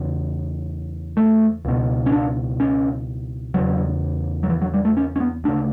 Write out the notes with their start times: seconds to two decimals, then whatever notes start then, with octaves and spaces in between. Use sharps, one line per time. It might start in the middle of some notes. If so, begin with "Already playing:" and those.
Already playing: E2 C#3
1.17 A3
1.65 C#2 B2
2.06 C#4
2.12 D4
2.60 C#4
3.54 E2 C#3 F#3
4.43 F#3
4.49 E3
4.62 F#3
4.74 G3
4.85 A3
4.97 C#4
5.16 C#4
5.20 B3
5.44 D2 C#3 D4